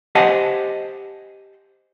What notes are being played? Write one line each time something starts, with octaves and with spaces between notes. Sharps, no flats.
G4 C5 D#5 F#5 G#5 A5